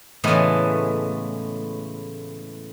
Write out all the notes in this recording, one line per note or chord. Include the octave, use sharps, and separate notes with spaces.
A2 C#3 E3 G#3 A3 B3